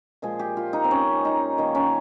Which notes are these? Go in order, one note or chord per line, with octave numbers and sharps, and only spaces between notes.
A#2 F3 G#3 G#4
G4
F4
D#4
C4
C#4
D#4
D#3 A#3
C#4